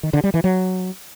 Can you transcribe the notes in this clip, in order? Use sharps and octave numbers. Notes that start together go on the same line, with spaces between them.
D#3
D3
G3
E3
F#3